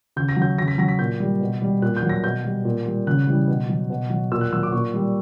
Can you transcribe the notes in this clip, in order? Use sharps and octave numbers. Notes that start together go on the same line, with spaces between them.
C#3 G6
A#6
F#3
G6
C#3 A#6
B6
F#3 A#6
B6
A#2 G6
G3
B2
G3
A#2 F#6
G6
F#3
A#6
B2 G6
G3
A#2
G3
C#3 F#6
E3 G3
B2
F#3
B2
F#3
A#2 E6
F#6
F#3 E6
D6
A#2 C#6
G3